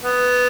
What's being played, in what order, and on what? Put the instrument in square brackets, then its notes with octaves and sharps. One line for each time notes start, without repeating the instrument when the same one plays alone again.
[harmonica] B3